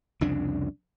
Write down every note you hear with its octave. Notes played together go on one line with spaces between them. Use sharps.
C2 F2 C#3 D4